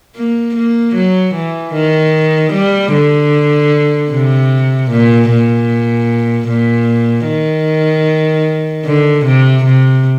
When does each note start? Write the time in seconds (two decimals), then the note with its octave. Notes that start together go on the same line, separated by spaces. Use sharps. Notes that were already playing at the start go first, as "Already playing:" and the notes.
0.16 A#3
0.56 A#3
0.95 F#3
1.35 E3
1.74 D#3
2.53 G3
2.92 D3
4.11 C3
4.91 A#2
5.30 A#2
6.48 A#2
7.27 D#3
8.86 D3
9.26 C3
9.65 C3